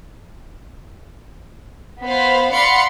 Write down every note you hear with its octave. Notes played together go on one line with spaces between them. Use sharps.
B3 C5 F5 B5
D5 F5 F#5 B5 C6 C#7